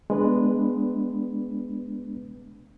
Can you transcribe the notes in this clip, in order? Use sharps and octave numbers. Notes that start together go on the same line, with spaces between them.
G#3 B3 D4 B4